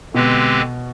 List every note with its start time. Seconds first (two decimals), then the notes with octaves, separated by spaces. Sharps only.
0.14 B2 D3 G#3 C4 G4 B4